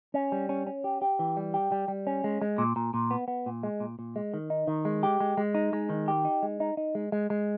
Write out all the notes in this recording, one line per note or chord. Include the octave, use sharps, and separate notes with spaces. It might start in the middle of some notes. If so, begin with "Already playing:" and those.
C#4
G3
C#4
C#4
G4
G4
E3
G3
G4
G3
G3
C#4
G#3
G#3
A#2
A#2
A#2
B3
B3
A#2
G#3
A#2
A#2
G#3
D#3
D#4
D#3
G#3
G4
G#3
G#3
D#4
G#3
D#3
G4
D#4
G#3
D#4
D#4
G#3
G#3
G#3